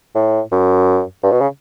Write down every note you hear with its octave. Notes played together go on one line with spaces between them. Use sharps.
A2
F#2
G2
B2
C#3